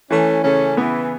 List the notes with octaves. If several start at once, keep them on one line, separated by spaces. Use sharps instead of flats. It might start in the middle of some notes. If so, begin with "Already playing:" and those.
E3 A3 C#4
C#3 A3 C#4
E3 B3